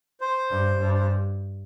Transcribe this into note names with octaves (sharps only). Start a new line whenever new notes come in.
C5
G2
G2
C5